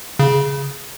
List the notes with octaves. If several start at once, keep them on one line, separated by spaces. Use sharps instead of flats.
C#3